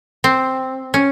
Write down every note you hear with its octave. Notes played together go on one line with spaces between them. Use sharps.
C4
C#4